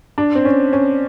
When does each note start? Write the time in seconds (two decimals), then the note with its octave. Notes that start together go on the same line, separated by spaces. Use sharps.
0.18 D4
0.35 C4
0.45 C#4
0.73 C#4